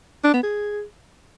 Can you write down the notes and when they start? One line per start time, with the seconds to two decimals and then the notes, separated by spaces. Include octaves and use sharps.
0.24 D4
0.33 B3
0.43 G#4